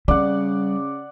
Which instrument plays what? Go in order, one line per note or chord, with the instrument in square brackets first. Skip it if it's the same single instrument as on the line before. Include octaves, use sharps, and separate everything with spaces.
[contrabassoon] C#3 [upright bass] G3 C4 [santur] D5 F#5